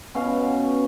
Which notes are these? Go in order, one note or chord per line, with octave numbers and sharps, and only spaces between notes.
B2 C#4 F5